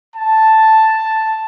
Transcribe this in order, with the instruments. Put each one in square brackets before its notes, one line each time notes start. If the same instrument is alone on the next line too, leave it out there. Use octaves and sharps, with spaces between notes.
[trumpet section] A5